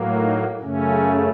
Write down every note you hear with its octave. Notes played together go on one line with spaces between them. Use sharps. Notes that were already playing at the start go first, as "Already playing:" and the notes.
Already playing: A2 F#3 A#3
D#4
F#2 C#3 A3 C#4